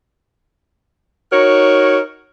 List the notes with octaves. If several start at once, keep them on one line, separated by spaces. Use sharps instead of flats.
D#4 F#4 A#4 C#5